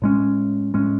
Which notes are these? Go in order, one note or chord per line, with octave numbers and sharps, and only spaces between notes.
A2 G#3 C#4
A2 G#3 C#4